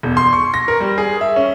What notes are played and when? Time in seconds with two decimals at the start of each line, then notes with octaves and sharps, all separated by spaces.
0.03 E1
0.17 C6
0.33 C#6
0.54 A#6
0.68 A#4
0.80 G3
0.98 G#4
1.21 E5
1.36 C#4